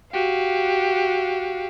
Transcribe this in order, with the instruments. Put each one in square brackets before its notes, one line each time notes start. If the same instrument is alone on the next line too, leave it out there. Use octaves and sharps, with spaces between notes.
[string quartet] F#4 G4 F5